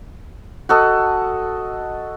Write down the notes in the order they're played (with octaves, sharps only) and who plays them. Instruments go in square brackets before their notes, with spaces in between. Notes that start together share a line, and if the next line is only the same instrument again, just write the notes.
[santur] F#4 A4 D#5